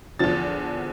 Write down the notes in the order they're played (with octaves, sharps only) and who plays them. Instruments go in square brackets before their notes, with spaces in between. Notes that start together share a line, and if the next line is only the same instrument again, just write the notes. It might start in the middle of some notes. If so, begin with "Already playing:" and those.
[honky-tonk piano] E2 D3 F3 A6